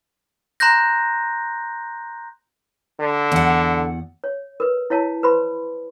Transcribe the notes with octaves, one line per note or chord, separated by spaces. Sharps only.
A#5 C6 F#6 G6 A#6
D3
E2 F#5
C#5
A#4 B4
E4 C#5 F5 A5
B4 C5 B5 C6